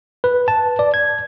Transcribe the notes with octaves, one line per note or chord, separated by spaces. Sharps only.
B4
A5
D5
G#6